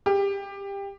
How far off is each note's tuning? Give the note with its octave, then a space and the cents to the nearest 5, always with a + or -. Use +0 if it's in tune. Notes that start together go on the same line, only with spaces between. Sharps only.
G4 +20